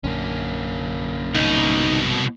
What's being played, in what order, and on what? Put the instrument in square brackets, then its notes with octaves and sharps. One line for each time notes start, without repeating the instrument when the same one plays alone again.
[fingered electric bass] A#1 F#2 D3 [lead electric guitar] A#3 C#4
[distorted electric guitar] C2 B2 [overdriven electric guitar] D#4